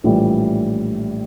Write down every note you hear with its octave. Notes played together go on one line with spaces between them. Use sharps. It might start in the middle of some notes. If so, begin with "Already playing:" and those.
A#1 A2 E3 G3